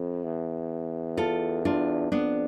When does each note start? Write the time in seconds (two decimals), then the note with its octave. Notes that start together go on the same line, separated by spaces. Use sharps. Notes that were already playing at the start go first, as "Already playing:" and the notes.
Already playing: F2
0.24 E2
1.17 F4 A4
1.65 D4 F4
2.12 F2 B3 D4